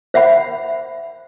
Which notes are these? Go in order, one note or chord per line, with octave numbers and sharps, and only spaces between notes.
C5 E5 F#5 B5